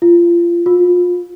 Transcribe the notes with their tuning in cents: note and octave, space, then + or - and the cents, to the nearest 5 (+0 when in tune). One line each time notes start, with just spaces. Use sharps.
F4 -25
F4 +30